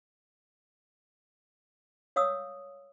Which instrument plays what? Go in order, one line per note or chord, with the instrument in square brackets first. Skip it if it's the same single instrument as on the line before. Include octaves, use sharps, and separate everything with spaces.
[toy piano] C#5 F5 D#6 E6